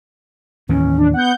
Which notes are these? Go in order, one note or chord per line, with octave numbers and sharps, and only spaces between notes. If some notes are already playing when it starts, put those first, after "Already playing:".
D#2 A2 E3 C#4
D4
B3 F#5 G6